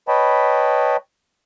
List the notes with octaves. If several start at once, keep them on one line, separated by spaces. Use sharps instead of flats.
B4 C#5 D#5 G5 A5 B5